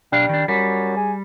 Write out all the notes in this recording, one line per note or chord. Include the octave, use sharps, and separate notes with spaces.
B1 G3 D4 F5
D#3 D4
F#2 G3
G#4